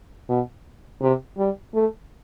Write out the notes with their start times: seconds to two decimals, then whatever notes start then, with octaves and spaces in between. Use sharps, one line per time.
0.29 B2
1.02 C3
1.38 G3
1.74 A3